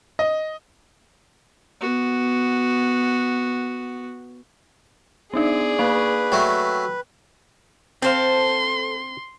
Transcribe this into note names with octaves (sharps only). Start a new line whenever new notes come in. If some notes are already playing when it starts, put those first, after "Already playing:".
D#5
B3 F#4
B3 D4 D#4 G#4 D5
A#3 B4 F5 C#6
F#3 A3 G5
C4 A4 C5 F5 C6